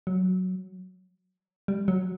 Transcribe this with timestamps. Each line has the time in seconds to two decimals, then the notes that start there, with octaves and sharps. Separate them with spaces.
0.07 F#3
1.68 G3
1.88 F#3